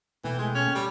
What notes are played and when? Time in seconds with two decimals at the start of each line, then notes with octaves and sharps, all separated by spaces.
0.24 B2 E3 A3 G5
0.38 G#3
0.54 C#4
0.75 G3